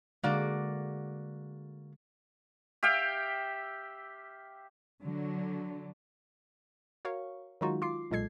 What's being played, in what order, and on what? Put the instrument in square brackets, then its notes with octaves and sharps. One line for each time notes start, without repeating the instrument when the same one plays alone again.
[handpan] D3 G#3 [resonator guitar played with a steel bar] A#3 F#4 D5
[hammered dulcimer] G4 E5 F5 G5
[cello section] D3 F#3
[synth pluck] F#4 A#4 C#5 F5 C#6
D#3 F#3 G#3 D#4 F4 F#4
F4 C6 D6 C7
B1 A#2 G#3 A4 G#6 C7